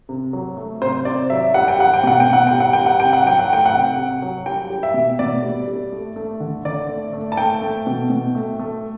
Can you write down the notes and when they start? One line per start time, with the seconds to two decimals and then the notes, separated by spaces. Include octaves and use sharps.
0.09 C3
0.33 F#3
0.57 A3
0.81 C3 C5
1.05 C3 D5
1.30 F#3 E5
1.54 G3 F#5
1.68 G5
1.79 G3 F#5
1.94 G5
2.04 B2 F#5
2.20 G5
2.28 B2
2.33 F#5
2.47 G3 G5
2.60 F#5
2.73 G3 G5
2.86 F#5
3.00 C3 G5
3.13 F#5
3.24 F#3 G5
3.39 F#5
3.49 A3 G5
3.66 F#5
3.73 C3
3.97 C3
4.22 F#3
4.46 G3 G5
4.70 G3
4.83 E5
4.94 B2
5.19 B2 D5
5.43 G3
5.68 G3
5.92 A3
6.16 A3
6.40 D3
6.65 D3 D5
6.89 A3
7.13 A3
7.32 A5
7.37 A3 G5
7.62 A3
7.87 B2
8.10 B2
8.35 A3
8.59 A3